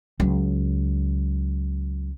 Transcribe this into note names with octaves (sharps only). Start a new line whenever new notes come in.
C#2 F#3